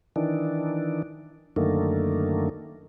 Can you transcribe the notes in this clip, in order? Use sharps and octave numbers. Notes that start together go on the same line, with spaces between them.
D#3 E3 D4
F#2 D3 D#3 A3 A#3